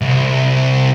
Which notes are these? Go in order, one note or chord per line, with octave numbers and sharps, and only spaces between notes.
C2